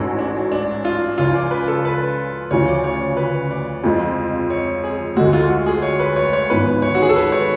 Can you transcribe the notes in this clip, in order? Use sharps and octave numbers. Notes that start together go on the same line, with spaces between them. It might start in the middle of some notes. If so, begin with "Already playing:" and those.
Already playing: A1 G#2 F#3 C#4 F#4 A4
D4
D4
F4
C#2 C#3 F3 F4
D5
B4
A4
B4
D2 C#3 F3 C#5
D5
C#5
B4
D5
F2 F3 G#3
C#5
G#4
D2 D3 G#3 F#4
F4
F#4
G#4
C#5
B4
C#5
C#5
G#1 G#2 F3 B3 B4
C#5
F#4
G#4
A4
B4
C#5
B4